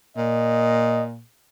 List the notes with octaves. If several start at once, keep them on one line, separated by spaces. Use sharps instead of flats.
A#2 D#5